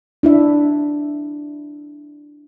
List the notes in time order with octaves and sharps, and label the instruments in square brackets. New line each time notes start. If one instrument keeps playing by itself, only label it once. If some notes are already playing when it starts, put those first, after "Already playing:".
[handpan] D4 E4 E5